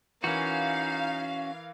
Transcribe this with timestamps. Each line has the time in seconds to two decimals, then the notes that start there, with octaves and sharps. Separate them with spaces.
0.24 E3 C#4 D#4 F#4 A#4 F5